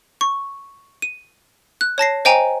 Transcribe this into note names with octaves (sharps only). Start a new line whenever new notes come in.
C#6
D#7
F#6
C#5 A5 A#6 C7
C5 D#5 G5 G#5 A#5